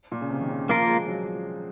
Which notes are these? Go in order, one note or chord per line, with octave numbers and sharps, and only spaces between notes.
A#2
C#3
C3
D#3
C#3
F3 A#3 F4 A#4
G#3
F#3